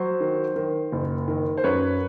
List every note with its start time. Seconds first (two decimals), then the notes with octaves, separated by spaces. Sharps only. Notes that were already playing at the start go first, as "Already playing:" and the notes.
Already playing: F#3 C5
0.20 D#3
0.56 D#3
0.92 F#1
1.28 D#3
1.57 C5
1.64 F#2 B4 C#5